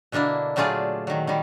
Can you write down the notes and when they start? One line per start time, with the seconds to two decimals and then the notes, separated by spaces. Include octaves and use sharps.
0.12 B2 D3 A#3 D4 E4
0.56 A#2 F#3 A3 F4 G#4 D5
1.07 D#3 F#3
1.27 D#3 G3